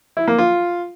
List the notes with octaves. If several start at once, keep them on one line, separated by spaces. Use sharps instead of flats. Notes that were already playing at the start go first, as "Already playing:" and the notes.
E4
A#3
F4